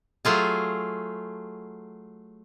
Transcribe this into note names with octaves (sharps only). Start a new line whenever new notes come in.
F#3 A3 F4 G#4